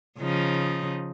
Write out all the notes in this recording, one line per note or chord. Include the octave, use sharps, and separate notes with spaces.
C#3 F3 D#4